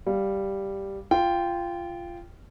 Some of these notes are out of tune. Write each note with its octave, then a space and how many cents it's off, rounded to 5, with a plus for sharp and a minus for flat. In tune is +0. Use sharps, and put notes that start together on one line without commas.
G3 +0 F5 +0
F4 -15 G5 +0